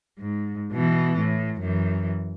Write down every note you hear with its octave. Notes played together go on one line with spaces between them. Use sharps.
G#2
B2 E3
A2
F#2 E3